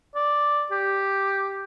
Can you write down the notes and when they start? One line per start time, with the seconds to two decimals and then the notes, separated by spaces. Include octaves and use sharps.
0.16 D5
0.71 G4